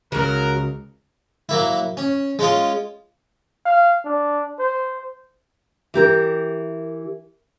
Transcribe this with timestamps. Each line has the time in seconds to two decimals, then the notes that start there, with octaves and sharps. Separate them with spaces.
0.12 C#2 C#3 F#3 F#4 A#4
1.49 F#3 A#3 E4
1.97 C#4
2.39 G#3 C#4 F4
3.65 F5
4.05 D4
4.59 C5
5.94 E3 G4 A#4